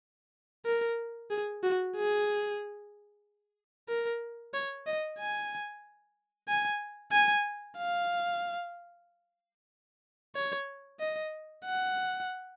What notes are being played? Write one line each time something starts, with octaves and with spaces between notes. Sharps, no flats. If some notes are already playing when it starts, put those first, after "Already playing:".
A#4
G#4
F#4
G#4
A#4
C#5
D#5
G#5
G#5
G#5
F5
C#5
D#5
F#5